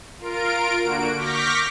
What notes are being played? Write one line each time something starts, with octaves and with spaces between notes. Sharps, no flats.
F4 A#4 D7
D3 A#3 F#4 D7
C#6 D6 F6 G6 A#6 B6